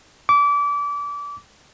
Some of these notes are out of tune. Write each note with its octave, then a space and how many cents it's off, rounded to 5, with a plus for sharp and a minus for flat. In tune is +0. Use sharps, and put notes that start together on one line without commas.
D6 -30